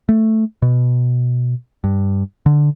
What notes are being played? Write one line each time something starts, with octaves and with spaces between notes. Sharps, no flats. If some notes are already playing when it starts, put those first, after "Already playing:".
A3
B2
G2
D3